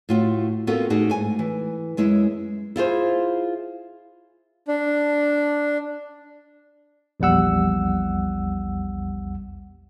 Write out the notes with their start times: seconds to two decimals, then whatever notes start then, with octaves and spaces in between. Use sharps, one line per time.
0.09 A2 F4 F#4
0.67 B3 C4 F4 F#4 A4 A#4
0.90 A2 D#4 F#4 G#4 D5
1.10 G#2 G#5
1.39 E3
1.97 F#2 G#3 E4 E5
2.76 E4 F4 G#4 C5
4.68 D4
7.20 A#1 E2 G3 F#5 E6